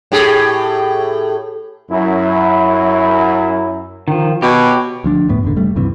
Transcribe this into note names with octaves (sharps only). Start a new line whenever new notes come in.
A2 G4 G#4
F#2 E4
D#3 F3
B2 G4 C#5
D2 F3 D4
D1 F#2 A2 B3
E1 A1 D3
F1 G3 A3
C#2 G2 C3 E3